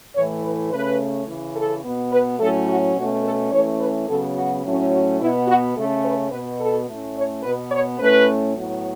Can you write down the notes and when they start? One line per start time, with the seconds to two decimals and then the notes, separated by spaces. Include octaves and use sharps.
0.15 A2 E3 A3 C#5
0.43 B4
0.71 C#3 A3 C#4 B4
1.27 C#3 E3 C#4
1.55 A4
1.84 B2 B3
2.11 B4
2.39 A2 F#3 A3 C#4 A4
2.67 F#4
2.95 B2 A3 C#4 F#4
3.24 A4
3.51 E3 A3 C#4 C#5
3.79 B4
4.08 C#3 F#3 B3 A4
4.36 F#4
4.64 A2 F#3 A3 C#4
4.92 F#4
5.19 B2 B3 E4
5.47 F#4
5.75 C#3 A3 C#4 A4
6.04 B4
6.31 B2 B3 B4
6.60 A4
6.88 A2 A3 C#4
7.16 C#5
7.43 B2 B3 B4
7.71 C#5
7.99 A2 A3 C#4 B4
8.56 A2 F#3 B3